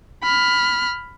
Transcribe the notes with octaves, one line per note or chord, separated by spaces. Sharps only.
B5 F6